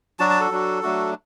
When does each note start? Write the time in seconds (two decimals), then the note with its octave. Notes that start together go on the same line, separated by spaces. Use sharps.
0.19 F#3 D4 F#4 A5
0.30 A5
0.40 A4
0.51 F#3 D4 F#4
0.83 F#3 A3 D4 F#4